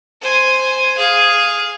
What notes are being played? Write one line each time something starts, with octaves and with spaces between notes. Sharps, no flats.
C5 G#5
G#4 F5